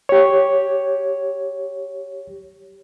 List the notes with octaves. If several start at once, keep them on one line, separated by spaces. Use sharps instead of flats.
G4 C#5